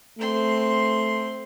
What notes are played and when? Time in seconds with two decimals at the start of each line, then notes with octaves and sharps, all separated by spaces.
0.19 A3 C4 C6